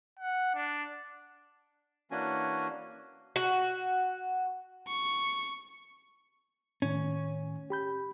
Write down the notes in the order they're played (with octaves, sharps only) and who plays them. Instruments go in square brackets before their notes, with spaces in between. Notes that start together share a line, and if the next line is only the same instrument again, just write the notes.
[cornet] F#5
D4
[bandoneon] E3 A#3 C#4 D4 F#4 G#5
[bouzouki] F#4
[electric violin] C#6
[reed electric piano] A2 D#3 [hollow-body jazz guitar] C#4
[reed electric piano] G4 B5 G6